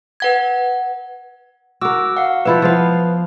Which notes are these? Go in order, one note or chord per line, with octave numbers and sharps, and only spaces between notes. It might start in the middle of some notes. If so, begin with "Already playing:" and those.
B4 F#5 G#6
F#4 A#4 D6 E6
F5 F#5
F3 E4 B4 E5
F3 B3 F5